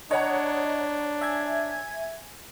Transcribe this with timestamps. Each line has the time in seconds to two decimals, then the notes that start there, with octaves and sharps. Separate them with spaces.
0.11 D4 C#5 D#5 F#5 A#5
1.21 E5 G#5 G#6